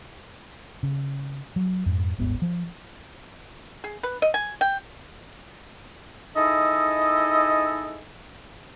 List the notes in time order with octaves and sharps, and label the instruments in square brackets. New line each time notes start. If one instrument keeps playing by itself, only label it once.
[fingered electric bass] C#3
F#3
F2 G#2
D1 G1 G#2 B3
F3
[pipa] G#4
B4
D#5
G#5
G5
[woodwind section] D#4 E4 G#4 A4 D#5